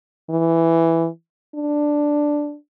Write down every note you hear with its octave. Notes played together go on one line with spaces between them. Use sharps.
E3
D4